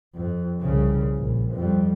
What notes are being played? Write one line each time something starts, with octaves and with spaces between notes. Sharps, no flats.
F2
C2 C#3
A#1
F2 G3